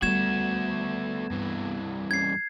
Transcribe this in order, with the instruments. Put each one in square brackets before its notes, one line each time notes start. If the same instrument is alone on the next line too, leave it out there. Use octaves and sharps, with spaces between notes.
[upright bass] G3 [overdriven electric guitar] A3 F#4 [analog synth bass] B3 [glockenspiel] G#6 E7
[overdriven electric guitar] G2 E3
[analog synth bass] C#4 [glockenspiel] G#6 C7